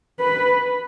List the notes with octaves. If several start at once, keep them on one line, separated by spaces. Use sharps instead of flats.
B4